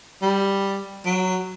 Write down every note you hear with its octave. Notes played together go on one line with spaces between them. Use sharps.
G3
F#3